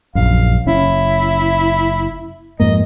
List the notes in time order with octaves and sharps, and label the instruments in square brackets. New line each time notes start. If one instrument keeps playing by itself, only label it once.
[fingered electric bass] A#1 F#2 [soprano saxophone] F5
[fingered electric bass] F#1 C#4 [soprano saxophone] E4
[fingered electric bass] F2 G#2 A#3 [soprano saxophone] D#5